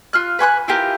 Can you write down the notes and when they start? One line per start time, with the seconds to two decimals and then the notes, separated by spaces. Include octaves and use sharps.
0.13 F4 F6 F#6
0.39 B4 G#5 C#6 F#6
0.68 E4 F4 G4 A#4